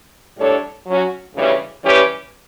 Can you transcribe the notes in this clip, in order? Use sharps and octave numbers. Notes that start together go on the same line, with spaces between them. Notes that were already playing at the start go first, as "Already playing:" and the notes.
A2 G3 D4 A4 C#5
F#3 C#4 F#4
D2 C#3 E3 G3 C#4
E3 G3 C#4 G4 B4